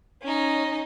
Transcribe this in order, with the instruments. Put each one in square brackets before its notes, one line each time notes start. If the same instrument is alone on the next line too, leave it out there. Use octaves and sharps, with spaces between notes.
[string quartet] C#4 D#4